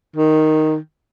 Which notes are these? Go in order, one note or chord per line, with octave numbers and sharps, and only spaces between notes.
D#3